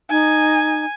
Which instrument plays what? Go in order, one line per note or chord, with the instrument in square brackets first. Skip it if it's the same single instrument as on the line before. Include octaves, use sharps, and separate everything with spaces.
[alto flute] D#4 [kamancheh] G#5